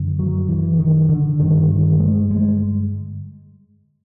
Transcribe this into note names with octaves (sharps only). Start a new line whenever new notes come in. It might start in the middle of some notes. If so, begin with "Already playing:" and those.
Already playing: F#2 D3
F#3
E3
D#3
D3
G2 D3 D#3
D#3
G#3
G#3